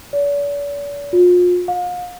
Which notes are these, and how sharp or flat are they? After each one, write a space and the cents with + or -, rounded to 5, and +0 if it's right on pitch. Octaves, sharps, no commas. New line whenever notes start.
D5 -45
F4 +35
F5 +40